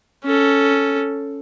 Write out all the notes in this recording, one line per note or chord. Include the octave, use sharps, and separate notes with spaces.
C#4 A4